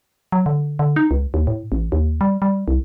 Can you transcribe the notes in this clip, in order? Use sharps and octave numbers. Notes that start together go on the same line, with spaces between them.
F#3
D3
D3
D#4
C#2
D#2
A2
A1
D#2
G3
G3
C2